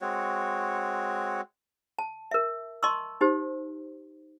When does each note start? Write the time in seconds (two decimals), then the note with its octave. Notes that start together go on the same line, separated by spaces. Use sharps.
0.01 G#3 C4 F#4 C#5
1.99 A5
2.31 A#4 E5
2.83 D#5 A5 C6 C#6 E6
3.21 D#4 G4 C5